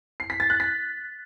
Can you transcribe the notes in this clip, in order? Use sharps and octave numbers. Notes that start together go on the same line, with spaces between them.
C7
B6
A6
F#6
B6